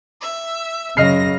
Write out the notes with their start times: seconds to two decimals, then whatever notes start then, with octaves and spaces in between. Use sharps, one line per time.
0.21 E5
0.97 F#2 C#3 D#5 F6 A#6 C7